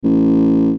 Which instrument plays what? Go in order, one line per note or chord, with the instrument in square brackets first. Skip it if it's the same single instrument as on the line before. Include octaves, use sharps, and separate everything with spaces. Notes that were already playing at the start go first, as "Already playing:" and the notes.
[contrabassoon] A1